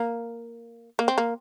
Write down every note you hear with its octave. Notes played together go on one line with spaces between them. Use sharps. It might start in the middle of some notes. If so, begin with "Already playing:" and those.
Already playing: A#3
A#3
C4
A#3